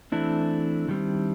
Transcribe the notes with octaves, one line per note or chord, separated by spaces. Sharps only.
E3 A3 C4 D4 E4
D#3 G3 C4